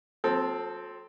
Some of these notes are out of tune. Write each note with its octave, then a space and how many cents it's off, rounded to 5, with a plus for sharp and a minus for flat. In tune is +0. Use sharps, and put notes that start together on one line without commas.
F#3 -45 C4 +0 A4 -10